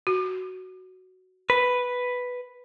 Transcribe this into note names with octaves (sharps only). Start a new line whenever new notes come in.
F#4
B4